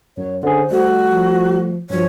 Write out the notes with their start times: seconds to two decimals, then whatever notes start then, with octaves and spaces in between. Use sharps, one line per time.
0.17 F#2 C#5
0.43 D3 C#4 G#4 C5
0.70 G3 A3 F#4
1.08 F3
1.90 G2 F3 F#3 C#5